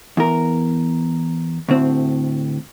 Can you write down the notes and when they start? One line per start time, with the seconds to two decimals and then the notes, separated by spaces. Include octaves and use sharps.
0.17 E2 A#4
1.69 D2 A2 C4